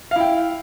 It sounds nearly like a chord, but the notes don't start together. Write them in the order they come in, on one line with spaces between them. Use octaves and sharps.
F5 E4 G5